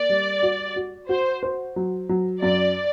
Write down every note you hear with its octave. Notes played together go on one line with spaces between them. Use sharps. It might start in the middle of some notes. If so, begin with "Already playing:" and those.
Already playing: A#3 D5
G3
F#4
F#4
F#4 C5
C5
F#3
F#3
F#2 D5